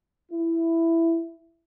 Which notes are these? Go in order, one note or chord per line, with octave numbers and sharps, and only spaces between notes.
E4